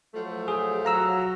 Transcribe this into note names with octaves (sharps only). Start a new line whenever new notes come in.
F3 F#3 A3
G#4
F#3 F5 A#5 E6